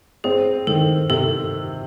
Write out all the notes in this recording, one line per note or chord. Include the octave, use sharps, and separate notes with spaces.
C4 G#4
D#3 A4
C3 A4